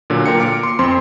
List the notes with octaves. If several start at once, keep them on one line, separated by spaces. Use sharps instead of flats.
A#2 D3 F#3
A#3 F4 A#4 F5 G5 C#7
D6 F6 C#7 D7
C6
F2 C4 C6